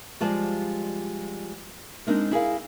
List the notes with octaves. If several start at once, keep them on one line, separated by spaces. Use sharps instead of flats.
F3 G3 G#3 F4 D5 A5
G#3 C4 D4 D#4 A#4 C5
E4 G#4 A#4 F5